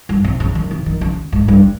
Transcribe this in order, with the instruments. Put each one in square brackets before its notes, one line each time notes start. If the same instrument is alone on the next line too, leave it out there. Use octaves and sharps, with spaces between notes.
[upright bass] G2
C3
C#3
D#3
C3
D#3
C#3
G#2
G2